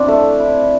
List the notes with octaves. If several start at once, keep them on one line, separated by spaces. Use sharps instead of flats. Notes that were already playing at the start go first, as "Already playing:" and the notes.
Already playing: C4 D4 E4 D5
A3
E4